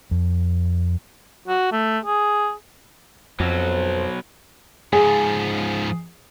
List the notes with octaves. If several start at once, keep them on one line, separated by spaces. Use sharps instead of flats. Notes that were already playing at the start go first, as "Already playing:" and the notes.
F2
F#4
A3
G#4
F2 B2 F#3 A4 B4 C5
G#2 F3 G#4